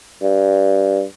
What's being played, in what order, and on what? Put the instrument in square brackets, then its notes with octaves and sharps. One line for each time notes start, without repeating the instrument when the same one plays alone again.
[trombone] G2